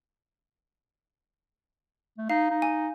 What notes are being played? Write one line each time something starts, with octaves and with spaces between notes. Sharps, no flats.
A3
D#4 F5
D#4
G#5